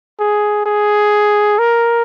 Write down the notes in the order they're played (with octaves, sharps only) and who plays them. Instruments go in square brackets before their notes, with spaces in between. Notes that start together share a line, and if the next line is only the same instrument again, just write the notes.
[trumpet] G#4
G#4
A#4